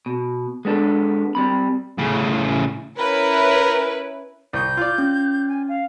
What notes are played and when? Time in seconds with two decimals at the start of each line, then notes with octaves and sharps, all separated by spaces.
0.06 B2
0.65 G#3 B3 D4 A4
1.35 G3 C4 B5
1.99 A2 C#3
2.99 C#4 E4 A#4 B4 B5
4.53 C2 D#6 G6
4.77 F4 D5
4.98 C#4
5.48 G#5
5.68 F5